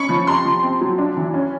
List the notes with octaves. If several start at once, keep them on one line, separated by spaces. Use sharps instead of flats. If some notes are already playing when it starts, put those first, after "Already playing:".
Already playing: C#4 B5 C#6
F3
C3 A#5 C6
F3
C4
F#3
D4
E3
C#4